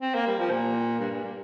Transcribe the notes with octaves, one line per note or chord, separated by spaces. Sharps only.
C4
A#3
G3
F3
A#2
G2
G2
A#3